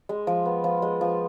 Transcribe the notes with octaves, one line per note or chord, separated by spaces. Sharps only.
G#3
F3
B3
F3
G#3
F3